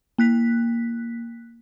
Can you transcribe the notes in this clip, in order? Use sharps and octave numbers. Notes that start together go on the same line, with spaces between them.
A#3 F#6 B6